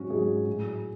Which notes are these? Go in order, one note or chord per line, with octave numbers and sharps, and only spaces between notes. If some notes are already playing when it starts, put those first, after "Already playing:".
Already playing: G#2 F#3 C#4 F#4
G#2 F#3 G#4
A2 F#3